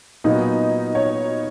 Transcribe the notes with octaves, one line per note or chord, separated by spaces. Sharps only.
A#2 F#3 B3 D#4
C#5